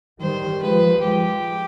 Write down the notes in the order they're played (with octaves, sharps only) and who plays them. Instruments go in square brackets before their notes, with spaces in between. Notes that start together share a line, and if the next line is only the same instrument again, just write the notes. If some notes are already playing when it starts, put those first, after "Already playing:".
[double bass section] D#3 G3 [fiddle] C5
[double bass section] F3 G#3 [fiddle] B4
[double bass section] F3 G#3 [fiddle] G4